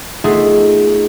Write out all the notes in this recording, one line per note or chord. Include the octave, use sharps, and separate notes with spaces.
A3 B3 D#4 F4 G#4